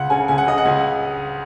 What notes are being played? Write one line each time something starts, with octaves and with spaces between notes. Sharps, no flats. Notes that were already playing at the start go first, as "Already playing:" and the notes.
Already playing: C#2 F#5
C#3 G#5
C#2 G#5
F#5
C#3 D#5
F#5
C#2